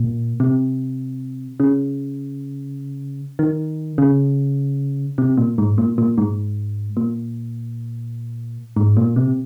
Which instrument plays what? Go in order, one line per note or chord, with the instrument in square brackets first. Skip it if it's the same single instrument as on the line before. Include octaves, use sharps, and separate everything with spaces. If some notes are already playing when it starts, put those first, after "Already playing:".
Already playing: [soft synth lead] A#2
C3
C#3
D#3
C#3
C3
A#2
G#2
A#2
A#2
G#2
A#2
G#2
A#2
C3